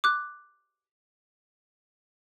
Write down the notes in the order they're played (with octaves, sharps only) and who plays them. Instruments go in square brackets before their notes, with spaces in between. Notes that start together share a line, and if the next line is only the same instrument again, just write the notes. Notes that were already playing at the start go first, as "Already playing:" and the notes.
[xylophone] D6 F#6